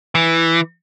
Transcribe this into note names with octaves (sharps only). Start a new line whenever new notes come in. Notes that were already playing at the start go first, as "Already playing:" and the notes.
E3